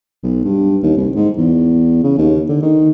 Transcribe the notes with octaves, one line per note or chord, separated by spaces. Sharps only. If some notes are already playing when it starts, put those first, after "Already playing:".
B1
G2
D#2
C2
G#2
E2
C#3
D#2
D3
D#3